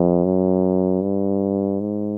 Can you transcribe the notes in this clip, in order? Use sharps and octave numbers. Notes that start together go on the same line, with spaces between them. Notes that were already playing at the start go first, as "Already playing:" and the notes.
Already playing: F2
F#2
G2
G#2